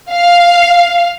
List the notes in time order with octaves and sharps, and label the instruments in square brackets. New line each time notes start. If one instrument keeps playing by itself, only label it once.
[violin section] F5